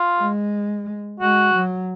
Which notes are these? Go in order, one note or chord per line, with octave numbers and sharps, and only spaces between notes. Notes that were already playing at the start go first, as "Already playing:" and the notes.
Already playing: F4
G#3
G#3 F#4
F#3